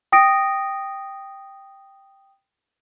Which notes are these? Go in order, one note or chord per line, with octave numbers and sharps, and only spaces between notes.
G5 D#6 A#6 D7